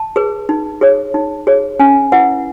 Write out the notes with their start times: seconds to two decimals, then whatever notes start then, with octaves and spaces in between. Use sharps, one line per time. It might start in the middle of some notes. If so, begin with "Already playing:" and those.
Already playing: A5
0.16 G#4 B4
0.49 D#4
0.81 G#4 C#5
1.14 D#4
1.47 G#4 C#5
1.80 C#4 G#5
2.12 E4 B4 F#5